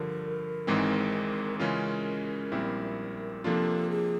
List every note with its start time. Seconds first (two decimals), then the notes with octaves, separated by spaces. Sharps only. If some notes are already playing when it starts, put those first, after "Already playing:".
Already playing: G2 D3 F3 A#4
0.67 G#1 G#2 E3 G#3 C4
1.59 C#3 E3 G#3 C#4 F4 A#4
2.52 A#1 A#2 G3 C4 E4
3.44 C3 F3 A#3 D4 F4 A4
3.90 G#4